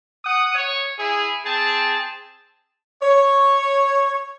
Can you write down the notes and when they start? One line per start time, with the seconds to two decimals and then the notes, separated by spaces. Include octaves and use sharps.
0.24 F#5 D#6
0.55 C#5
0.98 E4 G#4
1.45 C4 G#4 A5
3.02 C#5